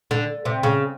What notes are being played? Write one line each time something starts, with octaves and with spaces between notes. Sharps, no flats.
D3
C3
C#3